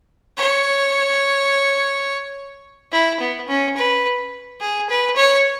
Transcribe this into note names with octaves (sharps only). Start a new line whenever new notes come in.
C#5
E4
B3
C#4
B4
G#4
B4
C#5